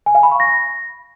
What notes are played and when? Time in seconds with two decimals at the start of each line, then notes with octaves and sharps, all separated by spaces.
0.06 G#5
0.15 F5
0.23 B5
0.31 C#6
0.40 A#6